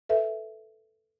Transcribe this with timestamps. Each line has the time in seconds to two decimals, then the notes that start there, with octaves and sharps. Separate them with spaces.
0.09 A4 B4 E5